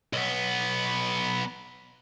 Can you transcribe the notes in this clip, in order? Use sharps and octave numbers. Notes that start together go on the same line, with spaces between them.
B1 B3